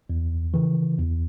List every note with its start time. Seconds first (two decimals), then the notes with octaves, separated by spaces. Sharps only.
0.10 E2
0.54 C#3 E3
0.98 E2